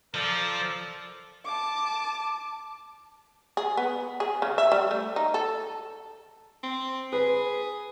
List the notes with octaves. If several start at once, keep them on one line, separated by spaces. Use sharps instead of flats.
F3 A4 A#4 D5
A5 D6
G#4
B3
G#4
C#3
E5
G3
A3
D#4
A4
C4
G#4 B4